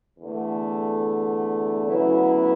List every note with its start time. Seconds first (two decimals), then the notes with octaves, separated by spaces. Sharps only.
0.18 E2 D3 A3
1.84 D2 C#3 F#3 B3 E4